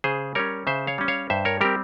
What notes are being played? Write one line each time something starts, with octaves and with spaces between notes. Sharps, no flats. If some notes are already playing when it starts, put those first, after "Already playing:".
C#3 G#4 C5
G3 C#4 A#4 C#5
C#3 C5 E5
C#5 F5
G3 C#4
C#5 F5
G2 C5 E5
A#4 C#5
G3 C4 G4 A#4